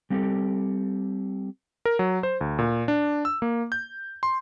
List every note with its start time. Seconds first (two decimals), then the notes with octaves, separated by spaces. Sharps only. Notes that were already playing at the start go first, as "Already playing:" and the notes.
0.10 G3 C4 D#4 F4 G4 A4
1.85 A#4
1.99 F#3
2.23 C5
2.41 D2
2.59 A#2
2.88 D4
3.25 E6
3.42 A#3
3.72 G6
4.23 C6